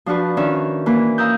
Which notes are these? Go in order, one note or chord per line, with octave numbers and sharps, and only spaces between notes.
F3 D4 F4 F#4 B4
D#3 C#4 D4 E5
E3 A#3 B4
F5 A#5 D#6 E6 G6